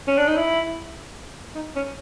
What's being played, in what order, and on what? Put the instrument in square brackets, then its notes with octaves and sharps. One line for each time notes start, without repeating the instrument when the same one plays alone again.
[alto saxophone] C#4
D4
D#4
E4
D#4
C#4